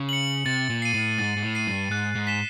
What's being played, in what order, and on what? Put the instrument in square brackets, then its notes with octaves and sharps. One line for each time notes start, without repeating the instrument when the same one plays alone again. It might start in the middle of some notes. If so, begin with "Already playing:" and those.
Already playing: [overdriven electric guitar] C#3
[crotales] C#7 F#7
[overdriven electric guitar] C3 [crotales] A6
[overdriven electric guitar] A#2
[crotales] C7 D#7
[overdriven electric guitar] A2
[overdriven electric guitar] G#2 [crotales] A6
[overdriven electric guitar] G#2
A2
[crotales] C7 D#7
[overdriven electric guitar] G2
[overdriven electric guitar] G#2 [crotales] F#6
[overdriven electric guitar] G#2
[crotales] B6 E7 G7